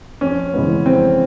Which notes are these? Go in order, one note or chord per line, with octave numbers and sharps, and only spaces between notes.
F2 C#4
C#3 E3 G#3 B3
F2 C4